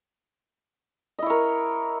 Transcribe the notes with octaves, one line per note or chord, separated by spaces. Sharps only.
E4 A#4 C#5 D#5